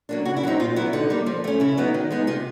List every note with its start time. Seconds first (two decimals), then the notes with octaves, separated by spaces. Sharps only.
0.09 F#3 A#3 D4
0.25 C#3 F#4
0.37 E4
0.43 F#3 A3 C4 D#4
0.60 A#2 F4
0.76 F#3 B3 E4
0.93 D3 D#4
1.10 G3 A#3
1.26 F3
1.44 A3 C#4
1.60 C#3 E4
1.77 F#3 B3 D#4
1.94 D#3
2.10 G#3 B3 D#4
2.27 C3 F4